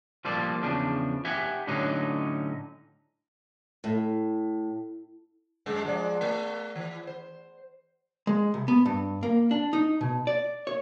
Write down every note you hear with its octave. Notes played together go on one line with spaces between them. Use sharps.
F3 G3 A#3 A4 C5 D5
E2 C#3 F3 D4
G4 E5 F#5 G#5
A2 D3 F#3 C#4 D#4
A2
F#2 G#3
F3 G#3 D5
A3
E3
C5
G#3
C2
B3
G2
A#3
D4
D#4
B2
D5
C#5